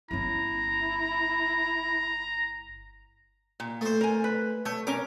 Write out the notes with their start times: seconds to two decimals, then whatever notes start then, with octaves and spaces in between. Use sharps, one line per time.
0.11 G1 C#4 E4 A#5
3.60 A#2
3.81 A3 C5
4.01 A#4 G#5
4.24 B4
4.66 A3 C#5
4.87 C#4 A#4 D6